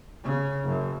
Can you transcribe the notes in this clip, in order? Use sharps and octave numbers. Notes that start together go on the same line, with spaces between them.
C#3
F#1 F#2